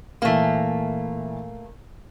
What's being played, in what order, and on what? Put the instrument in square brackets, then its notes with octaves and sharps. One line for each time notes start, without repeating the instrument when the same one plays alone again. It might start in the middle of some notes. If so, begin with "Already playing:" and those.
[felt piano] A#2 E3 [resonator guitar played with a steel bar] A3 A#3